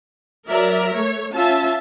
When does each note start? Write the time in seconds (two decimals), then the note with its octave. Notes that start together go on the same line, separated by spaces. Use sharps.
0.48 F#3 A#4 D5 E5
0.94 A3 C#5
1.36 C#4 F4 E5 A5